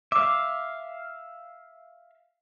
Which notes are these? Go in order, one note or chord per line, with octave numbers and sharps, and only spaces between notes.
E5 F5 D6